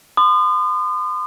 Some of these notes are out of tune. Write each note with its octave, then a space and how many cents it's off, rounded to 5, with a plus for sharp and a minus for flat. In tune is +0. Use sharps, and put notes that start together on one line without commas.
C6 -35 D#6 -40